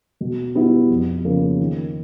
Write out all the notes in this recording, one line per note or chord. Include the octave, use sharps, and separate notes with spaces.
B2
G3 B3 E4
F2
C#3 F3 A#3
D#3